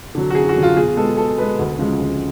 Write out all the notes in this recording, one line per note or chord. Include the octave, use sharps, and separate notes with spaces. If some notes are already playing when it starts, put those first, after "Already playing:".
D3 F#3
F#4
F#2 G#4
F#4
D3 F#3
F4
B2 G#4
G#3 B3 A4
B2 A4
G#3 B3 B4
D2
C#3 F3 G#3
D2